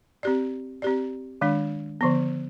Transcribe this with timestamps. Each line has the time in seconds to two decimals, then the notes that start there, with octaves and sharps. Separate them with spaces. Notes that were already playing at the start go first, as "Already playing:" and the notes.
0.23 C4 G4 D5
0.82 C4 G4 D5
1.41 D#3 G#3 D4
2.01 D3 F3 B3